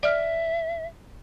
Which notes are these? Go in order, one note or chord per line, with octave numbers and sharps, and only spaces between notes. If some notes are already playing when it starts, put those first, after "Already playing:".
D5 E5 F6